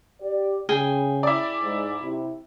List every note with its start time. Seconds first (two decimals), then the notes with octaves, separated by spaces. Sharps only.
0.22 G4 D5
0.69 C#3 G#4 G5 G#5
1.23 E4 D5
1.62 G#2
2.02 C3 E4